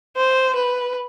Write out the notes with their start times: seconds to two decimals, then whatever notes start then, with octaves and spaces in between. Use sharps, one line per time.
0.16 C5
0.55 B4